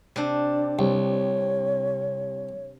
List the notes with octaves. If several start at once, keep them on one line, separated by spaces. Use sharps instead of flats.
C3 D4
C2 C#5